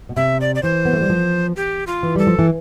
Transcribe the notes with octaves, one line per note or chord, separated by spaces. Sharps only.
B2
C3 E5
D5
D5
E3 C5
B3
A3
G3
F3
G4
F4
E3
G3 A4
F3
E3